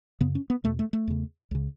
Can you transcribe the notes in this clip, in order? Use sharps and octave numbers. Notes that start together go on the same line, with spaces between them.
F#2 C#3 B3
C#4
B3
E2 B2 A3
A3
A3
E2 C#3
C#2 C#3